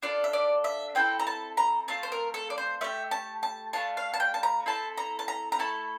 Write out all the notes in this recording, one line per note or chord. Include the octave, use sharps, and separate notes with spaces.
D4 F4 A4 D5
E5
D5
E5
C4 E4 A4 G5
A#5
A5
A#5
A3 C4 F4 A5
C5
A#4
A4
D5
C5
A3 E4 G4 E5
A5
A5
A3 D4 F4 A5
F5
A5
G5
A5
A#5
C4 E4 A4 A5
A#5
A5
A#5
A#5
A3 E4 A4 A5